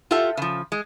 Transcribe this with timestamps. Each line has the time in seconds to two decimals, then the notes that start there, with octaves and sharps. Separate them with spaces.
0.11 F4 G4 A4 E5 F#5
0.37 C#3 F3
0.72 G#3